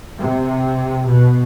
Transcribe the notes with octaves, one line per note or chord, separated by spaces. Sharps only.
C3
B2